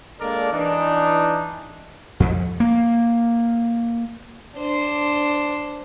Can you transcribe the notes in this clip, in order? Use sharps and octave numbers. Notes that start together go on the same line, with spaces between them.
G#3 A#3 D4 A4 A#4 D5
E3 D4 D#4
F2
A#3
D4 C5